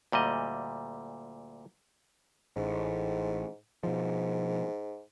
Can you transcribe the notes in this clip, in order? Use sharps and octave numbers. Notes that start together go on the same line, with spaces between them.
D2 A#2 G3 D#5
A1 G#2
G#2 B2 F3